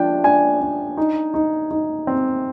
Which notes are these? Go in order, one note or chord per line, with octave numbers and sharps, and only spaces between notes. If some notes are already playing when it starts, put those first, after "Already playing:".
Already playing: F3 D4 G5
D4 G#5
D4
D#4
D#4
D#4
C4